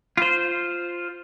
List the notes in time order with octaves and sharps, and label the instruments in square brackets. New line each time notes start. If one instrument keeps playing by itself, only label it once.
[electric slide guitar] F4 C5